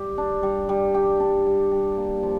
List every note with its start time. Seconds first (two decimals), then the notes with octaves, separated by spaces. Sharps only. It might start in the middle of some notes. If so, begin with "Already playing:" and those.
Already playing: G3 G4
0.18 D4
0.43 G3
0.69 G3
0.94 G4
1.20 D4
1.46 G3
1.72 G3
1.97 A#3
2.23 F3